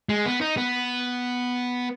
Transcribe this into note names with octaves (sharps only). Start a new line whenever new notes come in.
G#3
B3
D#4
B3